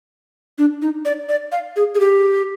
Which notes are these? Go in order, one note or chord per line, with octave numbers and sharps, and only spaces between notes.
D4
D#4
D5
D5
F5
G#4
G#4
G4